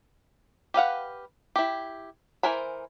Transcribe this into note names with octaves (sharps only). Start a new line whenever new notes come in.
G4 B4 F5 F#5
E4 G4
E3 A#4 C5 G#5 B5